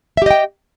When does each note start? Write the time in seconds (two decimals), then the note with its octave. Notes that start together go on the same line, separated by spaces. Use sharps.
0.17 E5
0.22 G4
0.26 D#5
0.31 G5